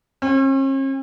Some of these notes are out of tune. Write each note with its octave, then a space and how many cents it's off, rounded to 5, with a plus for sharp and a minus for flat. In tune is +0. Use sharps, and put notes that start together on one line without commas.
C#4 -45